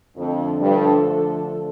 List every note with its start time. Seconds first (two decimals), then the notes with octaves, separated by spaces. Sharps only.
0.17 F2 D3 F3 A3 D4 A4
0.61 G2